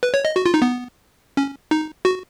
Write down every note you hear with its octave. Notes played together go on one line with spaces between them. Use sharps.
B4
C#5
D#5
F#4
F4
D#4
B3
C#4
D#4
F#4